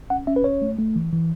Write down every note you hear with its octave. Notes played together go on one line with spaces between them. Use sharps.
C#4 F#5
C#4 E5
B4
C#4 C#5
A3
A3
E3
E3